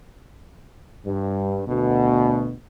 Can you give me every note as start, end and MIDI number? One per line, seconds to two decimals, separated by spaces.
1.06 1.63 43
1.68 2.53 38
1.68 2.53 47